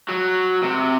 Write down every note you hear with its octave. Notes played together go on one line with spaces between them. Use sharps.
F#3
C3